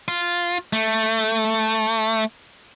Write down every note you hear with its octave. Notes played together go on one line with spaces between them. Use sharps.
F4
A3